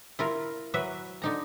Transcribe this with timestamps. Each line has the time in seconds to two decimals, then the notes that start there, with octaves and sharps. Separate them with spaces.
0.19 E4 F4 A#4
0.74 F#3 B4 E5
1.22 D3 D#4 A#5